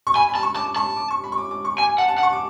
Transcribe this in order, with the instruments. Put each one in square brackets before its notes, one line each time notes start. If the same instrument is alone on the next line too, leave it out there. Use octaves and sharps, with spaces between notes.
[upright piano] C#6
[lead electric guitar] G#5 [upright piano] B5
[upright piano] B5
[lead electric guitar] A5
[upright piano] C#6
[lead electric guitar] A5 [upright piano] D6
[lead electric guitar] A5 [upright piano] C#6
[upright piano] D6
C#6
B5
C#6
D6
D6
C#6
[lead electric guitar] G#5 [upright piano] D6
[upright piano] G#5
[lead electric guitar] F#5 [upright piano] A5
[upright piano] A5
[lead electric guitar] F#5
[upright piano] C#6
D6